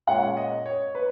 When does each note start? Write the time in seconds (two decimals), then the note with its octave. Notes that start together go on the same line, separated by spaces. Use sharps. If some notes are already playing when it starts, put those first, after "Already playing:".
0.07 A#2 G#3 C#4 F#5
0.37 D#5
0.66 C#5
0.95 B4